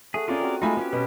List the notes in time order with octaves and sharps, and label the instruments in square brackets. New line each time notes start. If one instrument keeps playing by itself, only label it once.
[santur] A3 F#5 [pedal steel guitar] G#4
[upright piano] C#4 F4 [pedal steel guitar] G#4 A#4 D5
[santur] C4 F#4
[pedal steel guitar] G#3 A3 D#4 [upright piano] F4 G#5 B5
[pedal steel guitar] B3 C#4 G4
[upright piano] B2 [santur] B4